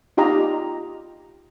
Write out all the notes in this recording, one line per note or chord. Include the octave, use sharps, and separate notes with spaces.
D#4 F4 G4 D#5 A#5